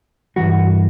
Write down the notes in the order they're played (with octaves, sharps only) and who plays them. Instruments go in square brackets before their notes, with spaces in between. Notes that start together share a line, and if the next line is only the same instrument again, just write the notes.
[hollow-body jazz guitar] G2 E3 G3 F#4